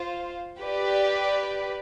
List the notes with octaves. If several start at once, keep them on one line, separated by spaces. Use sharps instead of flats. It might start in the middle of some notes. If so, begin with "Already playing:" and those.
Already playing: F4 C5 F5
G4 B4 D5